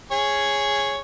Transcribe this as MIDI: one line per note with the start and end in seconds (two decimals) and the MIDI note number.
0.11 1.00 68
0.11 1.00 73